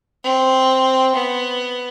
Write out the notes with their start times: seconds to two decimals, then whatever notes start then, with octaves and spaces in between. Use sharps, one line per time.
0.24 C4
1.15 B3